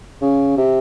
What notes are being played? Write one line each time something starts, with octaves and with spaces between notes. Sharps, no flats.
C#3
C3